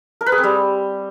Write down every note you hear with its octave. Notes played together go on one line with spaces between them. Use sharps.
A#4
B4
G#4
C4
G3